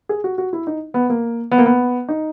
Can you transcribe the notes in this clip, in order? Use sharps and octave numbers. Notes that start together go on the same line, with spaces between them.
G#4
F#4
F#4
E4
D#4
B3
A#3
B3
A#3
B3
D#4